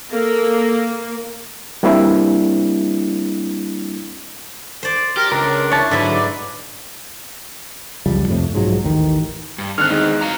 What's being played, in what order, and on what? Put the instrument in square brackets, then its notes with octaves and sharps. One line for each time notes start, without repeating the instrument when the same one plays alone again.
[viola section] A#3 [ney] A4
[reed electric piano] G3 A#3 C4 D4 E4
[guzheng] C5 D5
[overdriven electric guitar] G4 [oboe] A#4
[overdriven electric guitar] C#2 [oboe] D4 [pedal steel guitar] A#4
[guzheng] E4 [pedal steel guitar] C#5 A5
[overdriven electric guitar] G#2 [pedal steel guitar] D3 F#3 B4 [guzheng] E4 E5
[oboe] D5
[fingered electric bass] C#2 F#2 F3 G3
F2 A2 C3
B1 G#2 F3 F#3
A1 D#2 D#3
[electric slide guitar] G2
[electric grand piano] D3 [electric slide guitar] D#3 C4 [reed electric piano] F6 F#6
[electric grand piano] E2 G#3 D#4
[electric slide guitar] F#4 F5 A#5